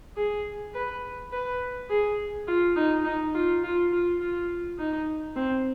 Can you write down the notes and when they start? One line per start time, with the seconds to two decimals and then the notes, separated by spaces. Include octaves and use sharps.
0.17 G#4
0.74 B4
1.32 B4
1.90 G#4
2.47 F4
2.76 D#4
3.05 D#4
3.34 F4
3.64 F4
3.92 F4
4.20 F4
4.79 D#4
5.36 C4